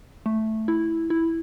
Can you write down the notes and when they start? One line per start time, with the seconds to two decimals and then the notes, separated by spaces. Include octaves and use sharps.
0.26 A3
0.68 E4
1.10 E4